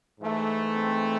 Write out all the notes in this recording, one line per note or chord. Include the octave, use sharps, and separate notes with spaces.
G#2 E3 A3
C4